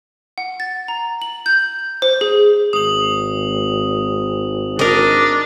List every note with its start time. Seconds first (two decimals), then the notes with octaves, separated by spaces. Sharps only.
0.38 F#5
0.60 A6
0.88 A#5
1.22 F#7
1.46 G6
2.02 C5
2.21 G#4
2.73 G#1 D#6 F#7
4.79 D4 A#4 D#5